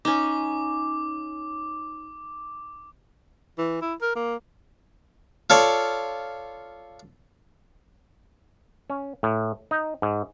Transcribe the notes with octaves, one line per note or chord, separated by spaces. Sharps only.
C#4 D#4 D6
E3
E4
A#4
A#3
F4 A4 C#5 D5
C#4
A2
D#4
G#2